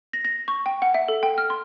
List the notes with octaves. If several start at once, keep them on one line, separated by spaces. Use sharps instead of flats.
A#6
A#6
C#6
G5
F#5
E5
A4
G5
F6
C6